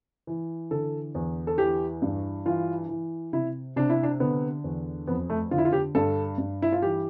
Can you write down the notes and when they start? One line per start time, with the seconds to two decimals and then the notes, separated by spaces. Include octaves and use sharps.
0.27 E3
0.71 D3 A4
1.15 E2
1.47 A4
1.58 E3 G4
2.02 G2
2.46 E3 F4
2.89 E3
3.33 C3 E4
3.76 C3 D4
3.90 E4
4.03 D4
4.20 D3 B3
4.64 E2
5.07 F2 B3
5.30 A3
5.51 D3 F4
5.58 E4
5.65 F4
5.73 G4
5.95 G2 A4
6.38 G2
6.62 E4
6.72 F4
6.82 E3 G4